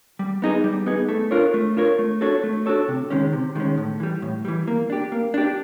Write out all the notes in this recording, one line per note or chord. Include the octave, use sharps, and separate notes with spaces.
G3
B3 D#4 G#4
G3
B3 D#4 G#4
A3
D4 F4 A#4 C#5
A3
D4 F4 A#4 C#5
A3
D4 F#4 A4 C#5
A3
D4 F#4 A4 C#5
C3
D#3 G#3 C#4
C3
D#3 G#3 C#4
A2
E3 G3
A2
E3 G3
A#3
D4 G4
A#3
D4 G4